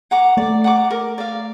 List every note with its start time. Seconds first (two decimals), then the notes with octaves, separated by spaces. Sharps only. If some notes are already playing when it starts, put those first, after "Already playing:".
0.11 F#5 A#5 D6
0.37 A3 D5
0.64 F#5 A#5 D6
0.91 A#4
1.18 D5 F5